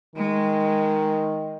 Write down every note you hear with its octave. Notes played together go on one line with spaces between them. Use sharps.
D#3 G#3